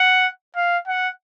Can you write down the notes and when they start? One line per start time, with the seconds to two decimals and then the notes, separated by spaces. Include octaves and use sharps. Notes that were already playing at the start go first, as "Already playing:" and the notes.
Already playing: F#5
0.56 F5
0.87 F#5